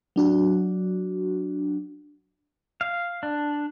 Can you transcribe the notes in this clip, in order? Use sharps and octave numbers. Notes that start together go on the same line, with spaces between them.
F#3 D4 F#4
F5
D4